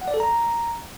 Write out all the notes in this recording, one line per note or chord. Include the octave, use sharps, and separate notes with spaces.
F#5
D5
A4
A#5